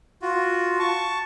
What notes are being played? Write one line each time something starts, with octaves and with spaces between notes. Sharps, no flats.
F4 F#4
A5 C#6